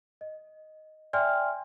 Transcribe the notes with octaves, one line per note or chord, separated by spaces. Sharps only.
D#5
D5 E5 G5 G#5 C6 F6